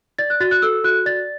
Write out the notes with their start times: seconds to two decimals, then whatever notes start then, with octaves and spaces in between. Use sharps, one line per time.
0.18 D5 A6
0.30 F#6
0.40 F#4 A6
0.51 F#6
0.62 A4 E6
0.84 F#4 F#6
1.06 D5 A6